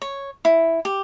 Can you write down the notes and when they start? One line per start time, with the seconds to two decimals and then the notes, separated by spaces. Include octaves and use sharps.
0.02 C#5
0.45 E4
0.85 G4